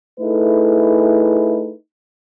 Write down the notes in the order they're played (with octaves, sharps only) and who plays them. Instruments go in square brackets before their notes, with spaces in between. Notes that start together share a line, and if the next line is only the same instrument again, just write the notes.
[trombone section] A3 D#4 E4 G#4 A4 B4